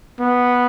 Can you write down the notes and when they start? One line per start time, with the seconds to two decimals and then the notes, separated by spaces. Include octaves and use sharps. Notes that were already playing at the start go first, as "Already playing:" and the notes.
0.21 B3